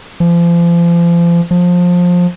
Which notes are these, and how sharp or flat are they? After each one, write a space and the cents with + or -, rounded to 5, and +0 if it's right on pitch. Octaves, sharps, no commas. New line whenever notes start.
F3 -35
F3 +20